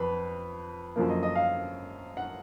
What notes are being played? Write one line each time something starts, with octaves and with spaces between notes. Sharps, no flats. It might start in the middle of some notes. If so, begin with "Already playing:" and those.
Already playing: F2 B4
F#2 D3 F3 A#3
D#5
D#5
F5
F#5